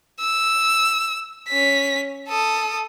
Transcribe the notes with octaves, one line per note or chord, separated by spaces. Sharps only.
E6
C#4 B6
A4 D#6